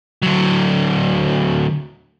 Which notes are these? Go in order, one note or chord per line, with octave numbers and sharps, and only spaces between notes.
D2 F#3